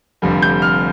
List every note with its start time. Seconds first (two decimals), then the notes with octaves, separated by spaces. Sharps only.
0.22 F1 F2 D3 G3
0.42 G6
0.62 F6